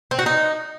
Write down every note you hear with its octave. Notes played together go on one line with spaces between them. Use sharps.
C4
F#4
D#4